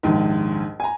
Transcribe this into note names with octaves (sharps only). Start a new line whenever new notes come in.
A#1 D#2 G#2
G#5 A#5